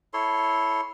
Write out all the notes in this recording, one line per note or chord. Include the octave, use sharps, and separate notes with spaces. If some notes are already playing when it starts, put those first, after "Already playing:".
E4 A4 C#5 C6